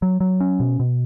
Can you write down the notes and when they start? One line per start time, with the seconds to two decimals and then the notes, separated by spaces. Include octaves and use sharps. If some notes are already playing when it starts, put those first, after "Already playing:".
0.02 F#3
0.20 F#3
0.40 C#4
0.60 B2
0.80 B2